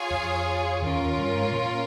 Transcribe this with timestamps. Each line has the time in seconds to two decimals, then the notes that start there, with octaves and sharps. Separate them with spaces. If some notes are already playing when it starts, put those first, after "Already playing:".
Already playing: F4 G#4 C#5 F5 G#5
0.10 F2 F3
0.82 D#2 D#3 C#4 F4 A#4
0.99 D#2 D#3
1.17 G2 G3
1.35 G#2 G#3
1.53 A#2 A#3